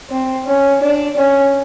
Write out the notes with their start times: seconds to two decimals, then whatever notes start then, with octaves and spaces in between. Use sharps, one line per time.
0.10 C4
0.46 C#4
0.82 D4
1.18 C#4